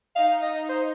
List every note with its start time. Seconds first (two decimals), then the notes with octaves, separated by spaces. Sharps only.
0.16 D#4 F5
0.42 D#5
0.69 C5